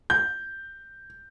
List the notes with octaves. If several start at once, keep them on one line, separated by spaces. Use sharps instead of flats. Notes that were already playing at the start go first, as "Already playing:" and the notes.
G6